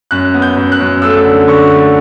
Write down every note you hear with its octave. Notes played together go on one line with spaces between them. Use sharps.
F#2 F#6
B3
G6
F#2
F#6
F#2
A3 E6
D3
D3 C#6
A3